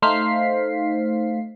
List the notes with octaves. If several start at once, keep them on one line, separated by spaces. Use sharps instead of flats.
A3 D#4 C5 F5 B6 C7